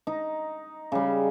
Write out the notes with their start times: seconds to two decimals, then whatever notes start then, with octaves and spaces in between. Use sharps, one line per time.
0.07 D#4
0.92 C#3 G3